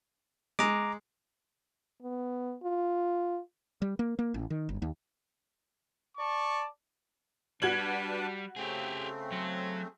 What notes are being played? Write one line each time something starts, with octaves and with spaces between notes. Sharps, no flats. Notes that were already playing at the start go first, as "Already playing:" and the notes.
G#3 A#5 D6
B3
F4
G3
A#3
A#3
A1
D#3
G1
D#2
D5 A5 C#6
G3 D4 F#4 B4 A5 G#6 F#7
C#3 A3 C4 G4 G#4
F#3